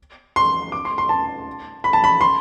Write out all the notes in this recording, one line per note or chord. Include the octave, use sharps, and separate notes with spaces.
C6
D6
C6
C6
A5
B5
A5
B5
C6